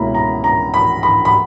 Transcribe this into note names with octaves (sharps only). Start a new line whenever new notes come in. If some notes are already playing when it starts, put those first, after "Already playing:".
Already playing: C#2 B2 A#3 C#4 E4 A#5 B5
A#5
A#5
B5
B5
B5